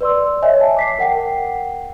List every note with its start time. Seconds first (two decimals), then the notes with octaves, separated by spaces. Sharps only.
0.01 B4 D5 C6 E6
0.42 C#5 D#5 E5 G#5
0.60 A5
0.77 D6 B6 C7
0.99 A#4 F#5 G5 C7